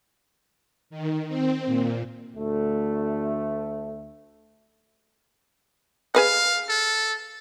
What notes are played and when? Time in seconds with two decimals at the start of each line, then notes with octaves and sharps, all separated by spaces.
0.90 D#3
1.28 C4
1.66 A#2
2.36 D2 A3
6.15 G#4 B4 D#5 F5
6.69 A4